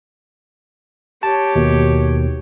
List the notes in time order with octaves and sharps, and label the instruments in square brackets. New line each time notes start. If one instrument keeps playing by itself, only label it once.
[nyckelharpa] G4 C#5 [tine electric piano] A5
[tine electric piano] D#2 B2